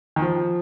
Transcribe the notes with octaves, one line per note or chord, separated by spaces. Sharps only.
D#3
F3